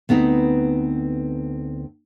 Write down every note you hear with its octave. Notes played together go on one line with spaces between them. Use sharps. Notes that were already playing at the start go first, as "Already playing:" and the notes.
D2 B3 C4 D#4 B4